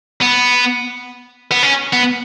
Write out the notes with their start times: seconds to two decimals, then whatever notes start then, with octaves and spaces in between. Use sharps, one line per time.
0.22 B3
1.51 B3
1.63 C#4
1.93 B3